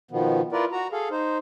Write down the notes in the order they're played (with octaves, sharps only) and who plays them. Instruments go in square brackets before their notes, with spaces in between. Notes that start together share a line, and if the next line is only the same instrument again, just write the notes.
[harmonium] B2 D#3 F3 B3
E4 F4 A#4 B4 D5
F#4 A#5
G#4 A4 F5
D#4 C5